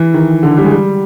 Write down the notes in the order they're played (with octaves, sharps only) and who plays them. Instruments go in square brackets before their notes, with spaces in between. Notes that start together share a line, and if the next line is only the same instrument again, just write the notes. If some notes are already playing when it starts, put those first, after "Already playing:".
Already playing: [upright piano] E3
D#3
D3
G3
G#3
G3